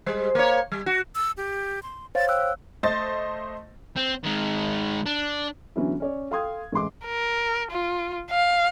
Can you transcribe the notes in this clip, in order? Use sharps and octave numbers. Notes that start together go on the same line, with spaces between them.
G3 G#3 C5
A#3 C#5
G3
F#4
E6
G4
C6
C5 C#5 F5 A6
G5 E6 F#6
A3 C5 D#5 A6
C4
D#3 G#3
D4
D3 E3 F#3 B3 C#4 E4
C#4 C#5 D5
A4 F5 G5 C6 D#6 G#6
A1 G#3 C6 D6
A#4
F4
F5